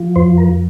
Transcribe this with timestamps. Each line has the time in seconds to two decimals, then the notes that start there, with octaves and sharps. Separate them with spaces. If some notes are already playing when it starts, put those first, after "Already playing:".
Already playing: F3
0.16 F2 C5
0.37 A#4